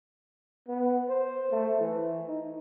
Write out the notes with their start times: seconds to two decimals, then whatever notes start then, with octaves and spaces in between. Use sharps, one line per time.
0.68 B3
1.09 C5
1.51 A3
1.80 E3
2.28 D#4